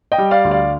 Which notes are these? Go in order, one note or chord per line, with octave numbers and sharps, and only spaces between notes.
D#5 G5
G3
D5 F5
D2
D5 F5